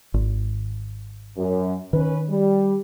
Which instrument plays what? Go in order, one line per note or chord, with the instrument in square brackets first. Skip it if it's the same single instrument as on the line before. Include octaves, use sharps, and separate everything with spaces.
[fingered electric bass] G#1
[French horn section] F#2
[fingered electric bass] D#3 [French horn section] C#4 B4
[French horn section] G3